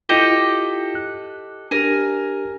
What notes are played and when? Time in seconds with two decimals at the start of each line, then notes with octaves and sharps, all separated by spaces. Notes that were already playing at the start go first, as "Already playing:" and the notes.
0.09 E4 F4 G4 A4 D#5
0.95 F#6
1.71 D4 G4 A#4 G#5